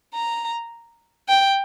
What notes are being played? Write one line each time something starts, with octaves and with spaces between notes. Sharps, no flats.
A#5
G5